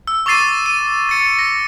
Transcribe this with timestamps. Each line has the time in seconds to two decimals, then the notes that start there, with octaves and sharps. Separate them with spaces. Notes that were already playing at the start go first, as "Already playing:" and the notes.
0.07 E6
0.26 C#6 D6 E6 A6 C7 D#7
0.66 D#7
1.09 A6 C#7
1.39 A#6